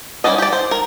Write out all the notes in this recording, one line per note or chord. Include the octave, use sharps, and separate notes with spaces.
G3 C#4 F#4 D5 D#5
G4 D5
C5
A#4